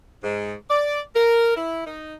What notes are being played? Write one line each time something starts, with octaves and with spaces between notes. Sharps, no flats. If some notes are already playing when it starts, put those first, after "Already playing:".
G#2
D5
A#4
E4
D#4